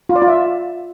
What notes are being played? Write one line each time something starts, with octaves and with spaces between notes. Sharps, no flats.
F4
D5
F4
E5